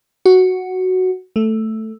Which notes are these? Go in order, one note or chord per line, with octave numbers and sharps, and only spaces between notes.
F#4
A3